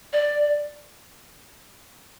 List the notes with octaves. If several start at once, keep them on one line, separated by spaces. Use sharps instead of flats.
D5